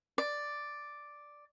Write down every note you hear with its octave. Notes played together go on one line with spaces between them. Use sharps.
D5